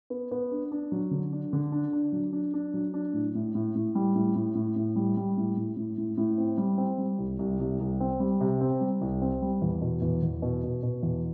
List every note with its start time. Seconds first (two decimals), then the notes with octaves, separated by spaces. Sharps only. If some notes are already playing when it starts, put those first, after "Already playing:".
0.10 B3
0.31 B3
0.51 D4
0.72 D4
0.92 F#3
1.11 D3
1.33 D4
1.53 D3
1.72 D4
1.93 D4
2.12 F#3
2.33 D4
2.54 D4
2.74 F#3
2.94 D4
3.14 A2
3.35 A2
3.55 A2
3.75 A2
3.95 G3
4.15 A2
4.35 A2
4.55 A2
4.76 A2
4.96 G3
5.17 G3
5.37 A2
5.57 A2
5.77 A2
5.98 A2
6.17 A2
6.38 C4
6.58 G3
6.78 C4
6.98 G3
7.18 C2
7.39 C2
7.59 C2
7.80 C2
8.00 C4
8.20 G3
8.41 C3
8.61 C4
8.81 G3
9.01 C2
9.22 C4
9.42 G3
9.62 E2
9.81 B2
10.02 E2
10.23 E2
10.42 B2
10.63 B2
10.83 B2
11.03 E2